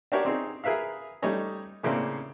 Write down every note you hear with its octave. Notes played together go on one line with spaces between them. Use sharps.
D4 F#4 G4 A#4 C#5 D5
C4 D#4 G#4
G#4 A#4 B4 E5 F5
G3 A3 D#4 C#5 D#5
A2 C#3 A#3 C4 D4